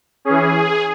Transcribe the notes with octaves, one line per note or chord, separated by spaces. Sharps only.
E3 C#4 G#4